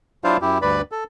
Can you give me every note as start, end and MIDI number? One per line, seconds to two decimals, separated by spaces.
0.24 0.37 54
0.24 0.37 62
0.24 0.37 64
0.24 0.37 65
0.24 0.37 72
0.24 0.37 77
0.42 0.58 42
0.42 0.58 64
0.42 0.58 67
0.62 0.81 38
0.62 0.81 43
0.62 0.81 71
0.62 0.81 74
0.62 0.81 83
0.92 1.04 69